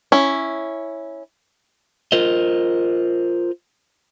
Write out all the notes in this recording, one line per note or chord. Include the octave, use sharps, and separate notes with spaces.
C#4 E4
F4 A#4 C5 D#5